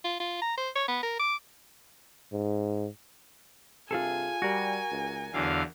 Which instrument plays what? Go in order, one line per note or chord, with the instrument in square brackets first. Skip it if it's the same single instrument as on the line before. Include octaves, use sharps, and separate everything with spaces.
[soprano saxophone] F4
F4
A#5
C5
C#5
B3
A#4
D6
[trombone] G#2
[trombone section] G2 C3 [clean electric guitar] F4 G#4 A4 [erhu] G#5
[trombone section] G3 [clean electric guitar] F#4 A#4
[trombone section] C#2
[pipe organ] E2 D3 F5 [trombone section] F#3 B3 E4